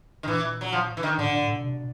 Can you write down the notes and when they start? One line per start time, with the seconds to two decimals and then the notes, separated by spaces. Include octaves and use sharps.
0.23 D#3
0.27 A#2 E3
0.61 F#3
0.72 F3
0.97 E3
1.03 D#3
1.18 A2 D3
1.30 A#2
1.41 A2
1.53 B2
1.64 C3
1.74 B2